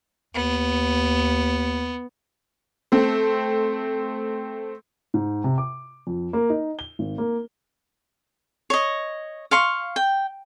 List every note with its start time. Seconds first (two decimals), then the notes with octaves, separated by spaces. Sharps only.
0.35 D#2 B3
2.92 A3 C4
5.14 G#2
5.44 C3
5.58 D6
6.07 F2
6.33 A#3
6.50 D#4
6.79 G7
6.99 G#1
7.18 A#3
8.70 C#5 D#5
9.51 F5 C6 C#6
9.96 G5